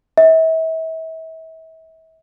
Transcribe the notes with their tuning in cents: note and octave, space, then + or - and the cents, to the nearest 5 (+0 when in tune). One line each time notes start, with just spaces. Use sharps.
E5 -35